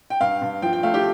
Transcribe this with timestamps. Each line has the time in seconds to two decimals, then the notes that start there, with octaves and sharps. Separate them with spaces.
0.10 G5
0.21 G2 F5
0.41 G2
0.62 F3 G5
0.73 G5
0.83 A3 F5
0.94 G4